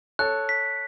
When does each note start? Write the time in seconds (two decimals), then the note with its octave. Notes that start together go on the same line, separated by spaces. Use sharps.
0.19 A4 C#5 F#6
0.49 B6